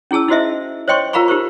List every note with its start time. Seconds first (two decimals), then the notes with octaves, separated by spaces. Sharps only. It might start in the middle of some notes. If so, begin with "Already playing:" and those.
0.11 C#4 E4 G#4 A5 E6
0.28 D#4 E4 F#4 C5 D#5 E5
0.88 C5 C#5 D#5 G5 C6 C#6
1.13 F4 A#4 F5 A#5 B5 C#6
1.28 D#4 G4 A#4 C5 C#6